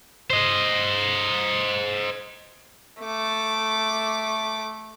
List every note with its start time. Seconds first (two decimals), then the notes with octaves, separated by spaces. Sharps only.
0.30 C5 D#5
3.02 A3 D6